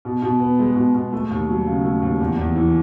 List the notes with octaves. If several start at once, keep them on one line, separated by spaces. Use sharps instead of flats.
B2
B2
B3
G#3
B2
B2
A3
D#2
F#3
C#3
A3
D#2
E2
E2
E3